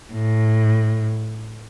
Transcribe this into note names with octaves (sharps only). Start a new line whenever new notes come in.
A2